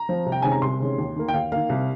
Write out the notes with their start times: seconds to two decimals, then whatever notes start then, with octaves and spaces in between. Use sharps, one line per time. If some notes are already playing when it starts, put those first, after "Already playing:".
Already playing: A#5
0.09 F3 C4
0.26 C2
0.32 G5
0.42 C3 D#3 G#3 C#4 G#5
0.52 A#5
0.62 C2 C6
0.80 C3 D#3 G#3 C#4
0.98 D#2
1.16 D#3 A#3
1.28 G5
1.34 D#2 F5
1.52 D#3 A#3 F5
1.69 C2